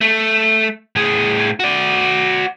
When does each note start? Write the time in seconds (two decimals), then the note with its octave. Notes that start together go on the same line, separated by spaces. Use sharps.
0.01 A3
0.96 A2 G#4
1.60 F#4 D5